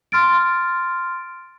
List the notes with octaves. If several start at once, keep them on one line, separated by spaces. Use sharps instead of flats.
C6 F6 A6 D7